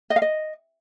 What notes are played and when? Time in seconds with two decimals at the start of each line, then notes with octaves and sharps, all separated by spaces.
0.10 D#5
0.16 F5
0.22 D#5